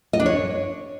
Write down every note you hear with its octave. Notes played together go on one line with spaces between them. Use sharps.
D#5
D4
C#5